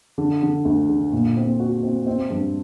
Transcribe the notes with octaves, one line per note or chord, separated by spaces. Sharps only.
D3
D3
D2
D3
A#2
C4
F#4
C4
C4
G2